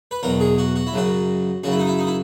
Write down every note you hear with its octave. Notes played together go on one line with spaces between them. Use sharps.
B4
E2 B2 F#3 A#4
G#4
F#4
F#4
E4
F#2 C#3 F#3 F#4
F#2 C#3 F#3 F#4
E4
D#4
E4
D#4
E4